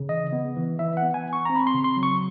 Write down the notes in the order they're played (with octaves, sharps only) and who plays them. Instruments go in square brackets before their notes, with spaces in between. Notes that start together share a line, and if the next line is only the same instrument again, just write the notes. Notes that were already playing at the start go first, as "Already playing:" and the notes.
Already playing: [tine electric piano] C#3
E3 D#5
B3
E3
E3 E5
F#5
B3
G#5
E3
C#6
C4 A#5
B5
C6
C#3
C6
F#3
C#6